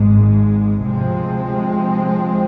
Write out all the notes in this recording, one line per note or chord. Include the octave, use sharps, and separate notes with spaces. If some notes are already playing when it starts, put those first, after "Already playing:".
Already playing: G#1 G#2 G#3
D2 C3 F3 G#3 C4